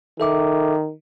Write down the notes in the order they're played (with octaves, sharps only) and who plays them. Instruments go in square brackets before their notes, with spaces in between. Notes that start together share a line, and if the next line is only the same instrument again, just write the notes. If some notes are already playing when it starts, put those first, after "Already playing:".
[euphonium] D#3 [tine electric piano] A4 E5 D6